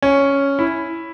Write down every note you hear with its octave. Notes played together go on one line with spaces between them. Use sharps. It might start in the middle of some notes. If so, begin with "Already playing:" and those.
C#4
E4